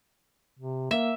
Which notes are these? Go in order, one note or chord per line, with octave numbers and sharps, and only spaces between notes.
C3
A#3 E5